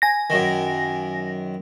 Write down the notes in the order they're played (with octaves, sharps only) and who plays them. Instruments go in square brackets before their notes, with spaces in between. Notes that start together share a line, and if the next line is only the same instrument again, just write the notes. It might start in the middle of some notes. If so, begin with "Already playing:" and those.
[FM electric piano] G#5 A#6
[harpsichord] F#2 D#3